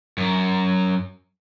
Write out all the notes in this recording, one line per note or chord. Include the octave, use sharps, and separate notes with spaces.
F#2